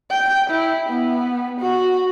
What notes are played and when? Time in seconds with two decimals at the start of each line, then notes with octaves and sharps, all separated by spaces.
0.10 G5
0.50 E4
0.89 B3
1.60 F#4